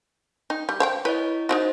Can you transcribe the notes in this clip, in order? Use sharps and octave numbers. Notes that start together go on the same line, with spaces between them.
D#4 G5
G3 G6
C5 F5 G5
E4 B4 C#5 D#5
D#4 E4 F#4 C5 D#5